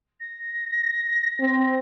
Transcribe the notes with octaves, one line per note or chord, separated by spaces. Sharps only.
A#6
C4